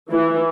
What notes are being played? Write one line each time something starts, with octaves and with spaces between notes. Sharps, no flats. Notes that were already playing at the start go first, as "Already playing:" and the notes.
E3